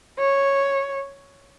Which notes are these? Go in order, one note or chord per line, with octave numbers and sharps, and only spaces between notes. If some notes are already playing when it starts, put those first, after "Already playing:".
C#5